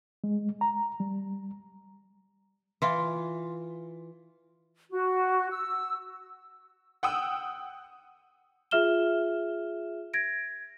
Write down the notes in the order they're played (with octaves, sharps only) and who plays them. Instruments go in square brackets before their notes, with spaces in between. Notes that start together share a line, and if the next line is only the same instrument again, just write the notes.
[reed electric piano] G#3
A#5
G3
[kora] E3 F4
[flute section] F#4
E6
[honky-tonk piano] F#5 G5 D#6 E6
[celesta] F4 G#4 E5 F6 E7 G7
G#6 A#6 D7